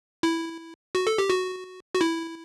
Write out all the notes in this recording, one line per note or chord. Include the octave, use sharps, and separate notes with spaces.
E4
F#4
A4
G4
F#4
F#4
E4